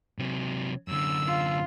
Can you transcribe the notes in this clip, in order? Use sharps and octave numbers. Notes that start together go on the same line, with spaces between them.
C3 F#3
F#2 D3 E6
F4